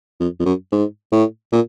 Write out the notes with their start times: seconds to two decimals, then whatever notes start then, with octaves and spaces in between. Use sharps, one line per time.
0.20 F2
0.40 F2
0.45 F#2
0.72 G#2
1.12 A2
1.52 A#2